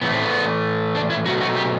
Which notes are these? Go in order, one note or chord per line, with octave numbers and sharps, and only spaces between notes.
A2 E3 A3 B3
C4
B3
D4
E4
B2 F#3 A3 F#4
F#4
G4